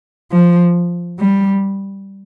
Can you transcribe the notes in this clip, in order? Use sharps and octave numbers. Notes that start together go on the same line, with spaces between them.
F3
G3